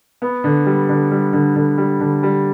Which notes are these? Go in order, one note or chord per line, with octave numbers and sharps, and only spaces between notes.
B3
D3
G3
D3
G3
D3
D3
G3
D3
G3